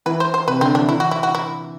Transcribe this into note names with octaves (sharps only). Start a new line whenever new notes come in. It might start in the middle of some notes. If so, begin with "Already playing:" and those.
E3 B4
C5
C5
C3 B4
D3 C4
E3 D4
E3 E4
F#4
E4
F#4
E4